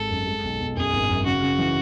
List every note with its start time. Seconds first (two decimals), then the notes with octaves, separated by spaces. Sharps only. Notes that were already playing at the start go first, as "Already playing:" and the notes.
Already playing: G#1 G#3 A4
0.10 F#2
0.26 G#3
0.43 B1
0.60 B1
0.76 F#2 G#4
0.93 G#1
1.09 F#2
1.25 C#3 F#4
1.42 C#3
1.59 E3